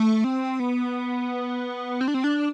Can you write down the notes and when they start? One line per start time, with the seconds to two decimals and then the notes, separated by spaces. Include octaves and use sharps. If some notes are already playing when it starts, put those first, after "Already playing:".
Already playing: A3
0.24 C4
0.60 B3
2.01 C4
2.08 D4
2.14 C4
2.24 D4